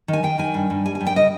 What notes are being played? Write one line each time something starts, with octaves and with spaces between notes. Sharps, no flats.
D#3
G#5
D#3 G5
D#3 G#5
G2
G2
G3 G#5
G#5
G2
G5
C#3 D#5